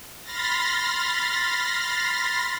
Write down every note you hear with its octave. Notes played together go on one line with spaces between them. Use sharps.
B5 C6 F6 A6 A#6